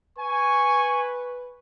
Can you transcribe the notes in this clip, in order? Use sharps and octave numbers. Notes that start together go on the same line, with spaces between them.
B4 G#5 C#6